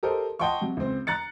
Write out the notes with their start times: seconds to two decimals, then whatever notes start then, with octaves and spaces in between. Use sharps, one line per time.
0.03 G4 A4 A#4 C5 D#5
0.39 D#5 F#5 G5 A5 C6 C#6
0.61 C3 F#3
0.77 C#2 C4
1.07 A#5 F#6 A6 C#7